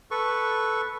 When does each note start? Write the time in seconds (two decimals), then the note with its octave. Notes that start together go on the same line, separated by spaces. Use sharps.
0.11 A4 B4 C#6